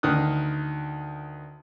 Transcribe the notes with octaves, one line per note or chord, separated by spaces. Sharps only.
D2 D#3 D#6 F#6